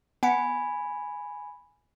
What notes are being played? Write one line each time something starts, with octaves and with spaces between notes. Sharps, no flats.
B3 F#5 G#5 B5